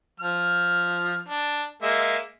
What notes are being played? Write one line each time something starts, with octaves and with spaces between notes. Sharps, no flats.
F3 F6
D4
G#3 A#3 E5